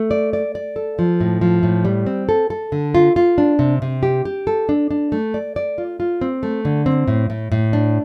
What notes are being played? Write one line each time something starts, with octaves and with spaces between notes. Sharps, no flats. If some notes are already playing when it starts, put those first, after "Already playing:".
Already playing: A3
D5
D5
D5
A4
F3
A2
F3
A2
G3
C4
A4
A4
D3
F4
F4
D4
C3
C3
G4
G4
A4
D4
D4
A3
D5
D5
F4
F4
C4
A3
D3
C4
A2
A2
A2
D4